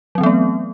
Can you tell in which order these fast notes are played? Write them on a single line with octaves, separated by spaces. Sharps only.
F#3 C4 E3 B3 A3